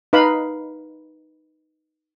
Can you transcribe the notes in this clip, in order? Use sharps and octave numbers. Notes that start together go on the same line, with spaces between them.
D#4 B4 F5 B5